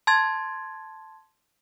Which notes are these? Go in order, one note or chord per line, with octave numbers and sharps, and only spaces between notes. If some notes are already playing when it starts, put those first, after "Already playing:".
A5 C6 G#6 A6